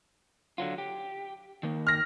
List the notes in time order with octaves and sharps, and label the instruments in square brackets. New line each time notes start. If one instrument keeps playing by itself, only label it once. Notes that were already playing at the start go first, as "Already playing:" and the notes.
[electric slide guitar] D3 F#3 F4
G4
D#3 A#3
[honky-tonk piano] F6 A#6